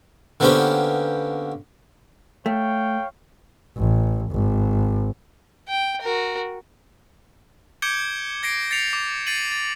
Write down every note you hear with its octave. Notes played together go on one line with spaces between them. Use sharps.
D3 A#3 B3 C#4 G4 C5
A3 C#5 F5 G5
A1
G#1
G5
F#4 A#4
D6 G6 G#6 C#7 D7 G7
G#6 A#6 C7 D7
A6 C7 C#7 F7
D6
A6 C7 C#7 D#7 F#7
A6